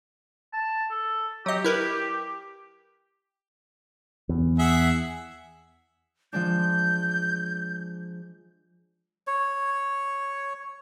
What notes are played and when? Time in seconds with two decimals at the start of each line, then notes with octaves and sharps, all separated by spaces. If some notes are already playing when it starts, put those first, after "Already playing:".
0.53 A5
0.91 A4
1.46 F#3 G4 D#5
1.64 E4 A#4 B4
4.29 E2
4.59 G#4 E5 F#5
6.33 F3 G#3 D4 G6
9.27 C#5